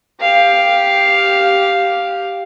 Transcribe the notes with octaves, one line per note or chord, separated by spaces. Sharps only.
G4 F5